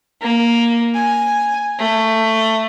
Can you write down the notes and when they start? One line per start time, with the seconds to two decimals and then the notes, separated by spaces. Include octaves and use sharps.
0.21 A#3
0.94 G#5
1.79 A3